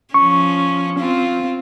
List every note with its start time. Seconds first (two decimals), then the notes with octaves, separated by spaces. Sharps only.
0.14 F3 C#4 C#6
0.99 C4 F4